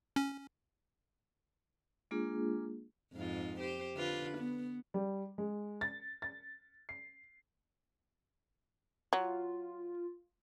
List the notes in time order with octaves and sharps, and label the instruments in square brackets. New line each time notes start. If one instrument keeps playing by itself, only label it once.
[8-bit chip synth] C#4
[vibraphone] G#3 A#3 D4 F4 G#4
[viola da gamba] F2 G#2 F4
G4 C5
D3 F4 B4
B3
[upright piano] G3
G#3
A6
A6
C7
[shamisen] F#3 [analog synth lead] F4